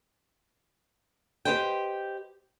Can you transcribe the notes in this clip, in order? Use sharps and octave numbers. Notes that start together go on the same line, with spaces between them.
G4 G#4 B4 C5 D#5 G5